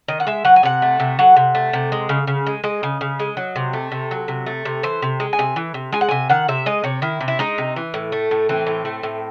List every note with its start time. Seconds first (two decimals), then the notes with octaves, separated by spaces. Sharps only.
0.08 D#3 D#5
0.20 F#5
0.27 G#3 E5
0.45 F#3 F#5
0.56 G#5
0.63 C3 F#5
0.82 A3
1.00 C3
1.19 F#3 F#5
1.36 C3
1.55 A3
1.73 C3
1.92 G#3
2.09 C#3
2.27 C#3
2.47 G#3
2.64 G#3 D#5
2.83 C#3
3.01 C#3
3.20 G#3
3.37 F#3
3.56 C3
3.73 A3
3.92 C3
4.11 F#3
4.28 C3
4.46 A3
4.65 C3
4.83 E3 C5
5.02 C3
5.20 G#3
5.33 G#5
5.39 C3
5.56 E3
5.74 C3
5.93 G#3 G#5
6.01 F#5
6.09 C3 G#5
6.30 D#3 F#5
6.48 C3 E5
6.66 G#3 D#5
6.84 C3 C#5
7.02 D#3 E4
7.21 C3
7.28 E4
7.39 G#3 D#4
7.58 C3
7.76 E3
7.94 A2
8.12 A3
8.31 A2
8.49 E3 C4
8.67 A2
8.85 A3
9.03 A2